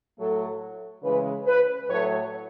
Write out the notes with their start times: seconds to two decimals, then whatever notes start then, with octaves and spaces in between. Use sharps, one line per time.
0.17 A2 F#3 A3 A4
1.03 C#3 E3 G#3 B4
1.46 B4
1.89 A2 F#3 A3 C#5